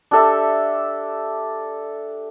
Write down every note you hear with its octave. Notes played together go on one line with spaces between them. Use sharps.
D4 G4 A4 E5